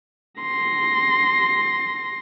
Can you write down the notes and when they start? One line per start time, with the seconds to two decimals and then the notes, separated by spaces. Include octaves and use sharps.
0.42 C6 A#6